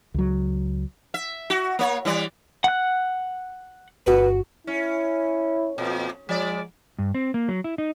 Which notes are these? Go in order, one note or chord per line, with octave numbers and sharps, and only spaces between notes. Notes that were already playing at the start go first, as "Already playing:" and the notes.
C#2 F#3
E5
F#4
A#3 C#5
E3 G3 D5
F#5 F#6
G1 F#4 B4
C#4 E4
F2 A#2
F3 G#3 D5
G2
C4
A#3
F#3
E4
D#4